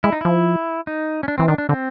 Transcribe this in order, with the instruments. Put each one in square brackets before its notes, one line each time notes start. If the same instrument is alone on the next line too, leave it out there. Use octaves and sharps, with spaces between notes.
[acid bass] G#3 [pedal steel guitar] E4
[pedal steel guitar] D#4
[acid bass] F3 [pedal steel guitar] E4
[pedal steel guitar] D#4
C#4
D4
[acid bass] E3 [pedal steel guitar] C4
[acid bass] D#3 [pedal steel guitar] D4
[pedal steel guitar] D4
[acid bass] D3 [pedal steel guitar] C4